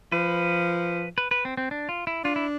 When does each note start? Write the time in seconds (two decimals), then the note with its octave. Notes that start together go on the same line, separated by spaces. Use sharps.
0.12 F3 B4
1.18 B4
1.31 B4
1.45 C4
1.57 C4
1.71 D4
1.89 F4
2.07 E4
2.24 D4 F4
2.36 E4